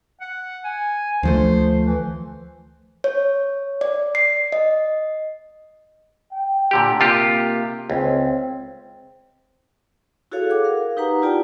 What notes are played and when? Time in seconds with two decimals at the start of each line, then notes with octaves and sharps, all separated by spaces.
0.21 F#5
0.64 G#5
1.23 D2 F3 A3 C5
1.87 E3
3.04 C#5
3.81 D5
4.15 C7
4.52 D#5
6.32 G5
6.71 A#2 D3 G4
7.00 C3 A#3 F4 G4
7.90 C#2 C4
10.32 E4 F#4 G#4 A4 C#5 F5
10.50 G#4 F#5 D6
10.64 A#4 F5
10.97 D#4 G4 B4 F#5 A#5
11.22 E4 F4 G4 D5 G5 A5